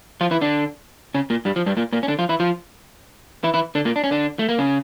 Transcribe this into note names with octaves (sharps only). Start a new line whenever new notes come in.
F3 F4
E3 E4
D3 D4
C#3 C#4
A#2 A#3
G2 G3
F3
G2 G3
A#2 A#3
A#2 A#3
C#4
D3 D4
F3 F4
E3 E4
F3 F4
E3 E4
E3 E4
D3 D4
A#2 A#3
D4
C#4
D3 D4
A3
A#3
C#3 C#4